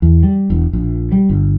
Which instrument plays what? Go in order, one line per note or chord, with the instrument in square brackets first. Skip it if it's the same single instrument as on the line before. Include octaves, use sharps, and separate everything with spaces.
[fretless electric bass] E2
G3
E1
A#1
G3
G1